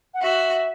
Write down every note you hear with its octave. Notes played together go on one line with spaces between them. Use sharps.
F#5
F#4 E5